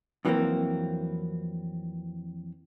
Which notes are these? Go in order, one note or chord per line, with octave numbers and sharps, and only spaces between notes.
F2 E3 F#3 A3 A#3 C4